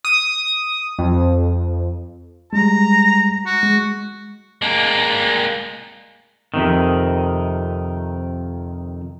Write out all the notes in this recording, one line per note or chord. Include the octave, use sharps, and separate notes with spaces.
D#6
F2
G3 G#3 A#5
F#4
G#3
G#3 A#3
F2 C3 D#3